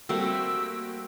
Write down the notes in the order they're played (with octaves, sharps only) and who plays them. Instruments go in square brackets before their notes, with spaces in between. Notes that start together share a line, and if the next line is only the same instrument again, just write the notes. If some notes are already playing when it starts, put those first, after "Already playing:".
[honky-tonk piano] G3 A#3 F#4 [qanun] A3 C4 [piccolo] E6